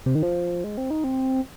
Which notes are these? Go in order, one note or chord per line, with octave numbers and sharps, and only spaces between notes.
C3
D#3
F3
G#3
C4
D#4
C4